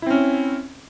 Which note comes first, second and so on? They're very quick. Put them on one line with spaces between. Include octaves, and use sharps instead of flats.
E4 C4 C#4